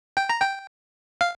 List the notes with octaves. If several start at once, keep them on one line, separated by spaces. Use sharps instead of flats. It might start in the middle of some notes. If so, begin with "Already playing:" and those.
G5
A#5
G5
F5